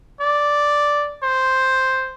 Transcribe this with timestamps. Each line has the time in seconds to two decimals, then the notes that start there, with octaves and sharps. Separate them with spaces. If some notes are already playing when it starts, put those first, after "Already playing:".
0.20 D5
1.23 C5